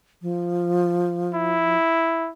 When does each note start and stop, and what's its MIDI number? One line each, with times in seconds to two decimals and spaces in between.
0.22 1.76 53
1.34 2.30 64